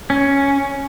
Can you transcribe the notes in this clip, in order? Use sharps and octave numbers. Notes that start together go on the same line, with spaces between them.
C#4